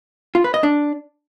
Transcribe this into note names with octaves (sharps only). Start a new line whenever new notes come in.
F4
B4
D#5
D4